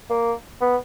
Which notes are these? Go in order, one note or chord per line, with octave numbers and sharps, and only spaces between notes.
A#3
B3